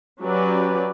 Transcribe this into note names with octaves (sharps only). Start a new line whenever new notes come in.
F#3 C#4 G4 B4 D5